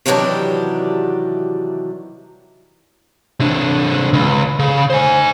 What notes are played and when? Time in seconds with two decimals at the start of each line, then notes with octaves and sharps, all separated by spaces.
0.06 C3 D#3 E3 F#3 G3 D4
3.40 C3 D4
4.13 C#2
4.59 C#3
4.90 C5 G#5